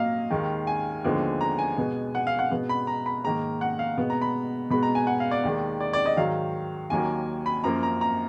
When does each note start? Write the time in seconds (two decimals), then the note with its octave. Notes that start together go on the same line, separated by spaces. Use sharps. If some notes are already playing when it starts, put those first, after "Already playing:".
Already playing: A#2 F#3 A#3 D#5 F5
0.30 D#2 D#3 G#3
0.67 G#5
1.04 D#2 D3 F3 G#3 B3
1.41 A#5
1.58 G#5
1.77 B2 G#3 B3
2.15 F#5
2.27 F5
2.39 F#5
2.51 B2 G#3 B3
2.69 B5
2.87 A#5
3.06 B5
3.24 G#2 D#3 A#3 A#5
3.61 F#5
3.79 F5
3.98 B2 G#3 B3
4.10 A#5
4.22 B5
4.70 B2 G#3 B3 B5
4.83 A#5
4.95 G#5
5.07 F#5
5.20 F5
5.31 D5
5.43 D#2 D#3 G#3
5.80 D5
5.93 D5
6.06 D#5
6.17 G#2 D#3 F#3 F5
6.90 D#2 D#3 F#3 A#3 G#5
7.46 B5
7.64 F#2 F3 A#3 A#5
7.83 A#5
8.01 A#5